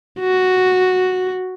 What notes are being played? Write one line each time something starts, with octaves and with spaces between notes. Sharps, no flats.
F#4